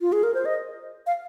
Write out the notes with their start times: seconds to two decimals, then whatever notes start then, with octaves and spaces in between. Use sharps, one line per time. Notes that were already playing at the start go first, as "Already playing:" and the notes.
0.01 F4
0.12 G#4
0.23 A#4
0.34 C5
0.45 D#5
1.07 F5